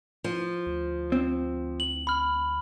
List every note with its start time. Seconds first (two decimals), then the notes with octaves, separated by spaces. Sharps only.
0.24 F3
0.66 D2
1.12 C4
1.80 F#7
2.07 B5 F6